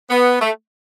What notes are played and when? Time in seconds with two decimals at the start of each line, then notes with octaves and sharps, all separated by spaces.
0.11 B3
0.41 A3